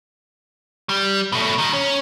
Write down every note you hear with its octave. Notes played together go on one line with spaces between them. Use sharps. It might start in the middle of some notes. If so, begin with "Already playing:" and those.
G3
B2 A3
D#3 G3
C#4